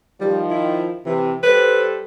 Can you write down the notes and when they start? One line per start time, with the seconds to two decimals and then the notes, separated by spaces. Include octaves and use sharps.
0.21 D#3 F3 G3
0.50 E4
1.06 C3 E3
1.43 G3 A4 B4 C5